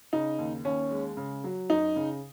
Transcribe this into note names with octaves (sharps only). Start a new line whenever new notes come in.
C#3 D#4
D#2
D#2 C#4
G#3
C#3
F#3
F#2 D#4
C#3